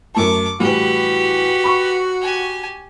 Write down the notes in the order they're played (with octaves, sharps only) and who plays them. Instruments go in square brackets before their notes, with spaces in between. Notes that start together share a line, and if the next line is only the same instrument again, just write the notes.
[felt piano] F#2 A3 A5 [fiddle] C#6 D6
[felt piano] A2 E3 G3 [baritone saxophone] F#4 [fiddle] G4 B4
[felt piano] B5 C#6
[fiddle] G4 G#5